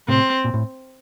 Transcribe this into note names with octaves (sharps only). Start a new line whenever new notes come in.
A2 C3 C4
A#2
A2